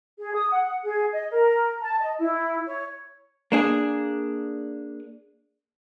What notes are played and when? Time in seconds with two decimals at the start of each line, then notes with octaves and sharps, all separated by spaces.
0.19 G#4
0.34 D#6
0.51 F#5
0.84 G#4
1.13 D#5
1.31 A#4
1.82 A5
2.00 D#5
2.19 E4
2.66 C#5
3.52 A#3 D4 G#4